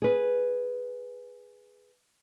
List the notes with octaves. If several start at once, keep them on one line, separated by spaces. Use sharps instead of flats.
G#4 B4